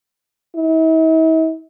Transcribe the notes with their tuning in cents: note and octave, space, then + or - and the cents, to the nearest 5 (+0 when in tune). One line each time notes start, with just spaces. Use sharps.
E4 -45